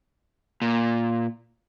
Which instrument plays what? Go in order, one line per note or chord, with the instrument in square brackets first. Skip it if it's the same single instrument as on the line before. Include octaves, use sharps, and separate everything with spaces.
[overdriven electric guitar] A#2